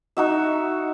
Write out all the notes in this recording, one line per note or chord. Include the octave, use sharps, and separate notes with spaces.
D#4 F#4 E5